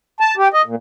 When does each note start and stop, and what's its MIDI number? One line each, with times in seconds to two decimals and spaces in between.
0.20 0.35 81
0.37 0.48 67
0.54 0.62 75
0.66 0.75 46